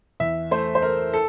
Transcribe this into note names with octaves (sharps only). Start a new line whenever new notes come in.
E2 E5
A3 C5
C5
A3 A#4
A4